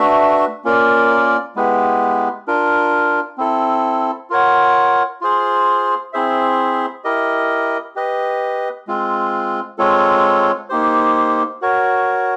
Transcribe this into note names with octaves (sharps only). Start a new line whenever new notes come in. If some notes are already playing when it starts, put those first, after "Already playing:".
Already playing: A3 D4 F#4 B4 E5
A#3 C#4 F4 A#4 D5
G#3 B3 E4 G4 B4
D4 F4 A#4
C4 E4 A4
F4 A#4 C#5 F#5
F4 G#4 C5
C4 E4 G#4 C5 E5
E4 G4 A#4 D#5
G4 B4 D#5
G#3 C4 F4
G#3 C4 F4 A4 C#5
A#3 D#4 G4 C5
F#4 A#4 C#5